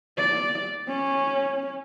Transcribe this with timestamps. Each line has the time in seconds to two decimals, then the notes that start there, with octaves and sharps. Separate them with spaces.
0.19 D5
0.88 C#4